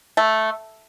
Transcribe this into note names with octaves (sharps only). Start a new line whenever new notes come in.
A3